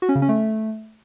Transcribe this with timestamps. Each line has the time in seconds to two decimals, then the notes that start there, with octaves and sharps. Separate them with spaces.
0.02 F#4
0.09 C#4
0.15 C#3
0.22 C#4
0.29 A3